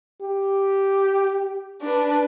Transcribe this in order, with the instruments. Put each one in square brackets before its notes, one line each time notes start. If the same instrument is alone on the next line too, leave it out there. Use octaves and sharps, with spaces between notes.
[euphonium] G4
[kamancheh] D4 B4